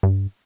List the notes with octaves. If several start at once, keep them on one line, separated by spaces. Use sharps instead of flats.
G2